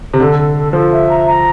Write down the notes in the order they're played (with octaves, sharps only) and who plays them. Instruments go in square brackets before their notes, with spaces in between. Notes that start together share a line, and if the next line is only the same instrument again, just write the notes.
[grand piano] C3
[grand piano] D3 [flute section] A4
[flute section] A4
A4
[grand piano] F3 [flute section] A4
[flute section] E5
A#5
A#5